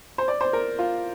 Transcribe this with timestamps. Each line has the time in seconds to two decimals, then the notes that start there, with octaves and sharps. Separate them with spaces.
0.18 C5
0.28 D5
0.41 C5
0.53 A#4
0.79 F4